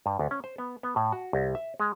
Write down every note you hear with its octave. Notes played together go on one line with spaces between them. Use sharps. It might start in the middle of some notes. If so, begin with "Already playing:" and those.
G2
D2
C#4
C5
B3
B3
A2
F#4
C2
E5
G#3